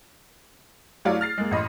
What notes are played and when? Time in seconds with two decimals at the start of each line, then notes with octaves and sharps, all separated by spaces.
1.05 F#3 A3 E4 C#5 D5 F5
1.21 F6 A6 C7
1.38 G#3 A#3
1.51 A1 D#5 B5 C6